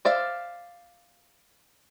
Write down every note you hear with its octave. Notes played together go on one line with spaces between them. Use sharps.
C5 D5 E5 F5